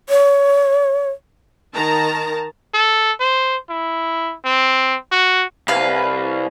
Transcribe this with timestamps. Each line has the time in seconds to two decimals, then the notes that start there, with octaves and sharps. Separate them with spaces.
0.09 C#5
1.74 D#3 A5 A#5
2.74 A4
3.20 C5
3.70 E4
4.45 C4
5.12 F#4
5.68 C2 B4 F5